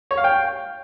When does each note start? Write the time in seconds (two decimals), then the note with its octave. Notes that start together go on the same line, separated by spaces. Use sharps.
0.11 C#5
0.17 F5
0.24 G5